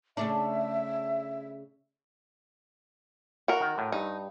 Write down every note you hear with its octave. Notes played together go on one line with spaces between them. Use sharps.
C#3 A3 D4 E5
F#4 A#4
D#3
A2
G2 D#4